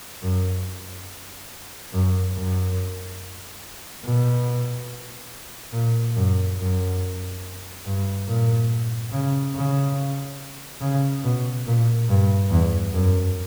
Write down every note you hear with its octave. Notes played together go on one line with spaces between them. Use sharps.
F#2
F#2
F#2
B2
A#2
F#2
F#2
G2
A#2
C#3
C#3
C#3
B2
A#2
G2
E2
F#2